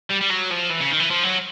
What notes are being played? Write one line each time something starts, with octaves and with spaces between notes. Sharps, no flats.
G3
G3
F#3
F3
E3
C#3
D#3
E3
F3
F#3